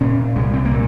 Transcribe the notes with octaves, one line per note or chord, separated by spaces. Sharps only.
A#2 C#4
C2 G#3
C4
A#3
A#2